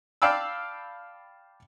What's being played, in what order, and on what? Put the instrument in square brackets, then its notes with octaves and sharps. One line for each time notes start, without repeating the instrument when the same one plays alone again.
[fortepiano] D5 F5 G5 A5 B5 E6